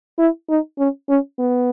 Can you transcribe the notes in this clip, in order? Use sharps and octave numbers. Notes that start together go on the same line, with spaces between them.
E4
D#4
C#4
C#4
B3